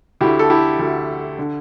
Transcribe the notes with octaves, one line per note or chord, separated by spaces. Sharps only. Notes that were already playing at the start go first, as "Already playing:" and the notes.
D2 D3 E4 G4
A4
E4 G4
D2 D3
D3